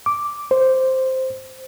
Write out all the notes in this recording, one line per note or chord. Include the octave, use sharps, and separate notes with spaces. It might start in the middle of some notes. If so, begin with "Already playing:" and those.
D6
C5